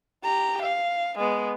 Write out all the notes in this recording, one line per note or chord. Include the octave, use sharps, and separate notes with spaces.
G4 A#5
F5
G#3 B3